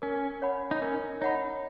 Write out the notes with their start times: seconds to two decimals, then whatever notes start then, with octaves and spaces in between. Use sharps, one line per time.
0.02 C#4 A#4
0.42 C#5 F#5 B5
0.71 D#4
0.82 C#4 A#4
1.21 D#4 C#5 F#5 B5